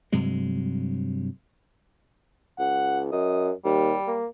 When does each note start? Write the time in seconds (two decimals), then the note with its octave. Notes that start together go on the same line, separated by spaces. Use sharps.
0.12 G2 C3 F#3 G#3
2.59 C#2 F#5
3.12 F#2 D#5
3.65 D#2 G3
4.07 A#3